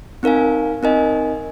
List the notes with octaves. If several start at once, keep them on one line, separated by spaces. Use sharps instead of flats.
C4 D#4 A#4 F5 G#5
C4 D#4 A#4 D#5 G#5